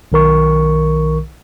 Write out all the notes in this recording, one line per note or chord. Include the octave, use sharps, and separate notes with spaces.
B1 D#3 A#4 C#6